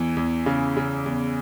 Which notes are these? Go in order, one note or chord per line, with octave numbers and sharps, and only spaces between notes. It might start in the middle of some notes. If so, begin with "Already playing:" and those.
Already playing: E2 E3
E2
C#3
C#3
E2